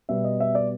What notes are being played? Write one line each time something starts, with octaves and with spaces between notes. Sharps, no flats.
B2 G3 B3 E5
D#5
E5
D5